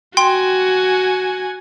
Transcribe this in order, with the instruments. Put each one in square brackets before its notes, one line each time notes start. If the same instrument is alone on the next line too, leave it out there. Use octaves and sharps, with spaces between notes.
[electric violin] F#4 G#5 [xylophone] G5 C6